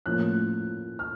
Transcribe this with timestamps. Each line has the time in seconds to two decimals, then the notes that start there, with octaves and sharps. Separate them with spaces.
0.06 A2 F3 A#3 C#4 E4 F#6
0.99 F6